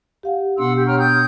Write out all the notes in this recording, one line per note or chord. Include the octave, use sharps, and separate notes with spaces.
G4 F5 F#5
B2 B3 D4 F#5 C6 E6
G4
C#5 G5 A#5 C#6 F6
G5 D#6 G6